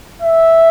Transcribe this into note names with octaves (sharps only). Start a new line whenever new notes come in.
E5